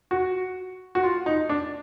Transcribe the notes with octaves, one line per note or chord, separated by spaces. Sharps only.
F#4
F#4
F4
D#4
D4